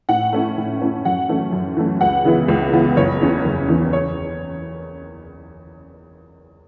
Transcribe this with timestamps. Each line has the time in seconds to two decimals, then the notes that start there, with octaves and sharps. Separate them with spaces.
0.09 A2 F#5
0.33 A3 C#4 E4
0.58 A2
0.82 A3 C#4 E4
1.05 F#2 F#5
1.29 E3 A3 C#4
1.52 F#2
1.77 E3 A3 C#4
2.01 C#2 F#5
2.24 C#3 E3 B3 E4
2.48 C#2
2.73 C#3 E3 B3 E4
2.96 F#1 C#5
3.21 E2 E3 C#4
3.45 F#1
3.69 E2 E3 C#4
3.93 C#5